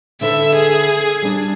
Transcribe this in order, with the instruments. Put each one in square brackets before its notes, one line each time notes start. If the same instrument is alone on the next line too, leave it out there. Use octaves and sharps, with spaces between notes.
[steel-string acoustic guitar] D3 A4 B4 [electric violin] E5
[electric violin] G#4
[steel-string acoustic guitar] G3 D4